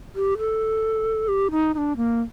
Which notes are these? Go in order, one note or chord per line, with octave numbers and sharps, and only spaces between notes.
G4
A4
G4
D#4
D#4
D4
A#3